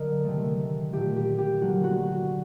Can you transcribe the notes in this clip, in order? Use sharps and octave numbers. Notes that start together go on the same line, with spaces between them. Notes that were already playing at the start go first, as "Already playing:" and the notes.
Already playing: D3 F#3 A#4 D#5
C3 D#3 A3
A#2 A3 G4
G4
G4
D3 F#3 A#3 F#4
F#4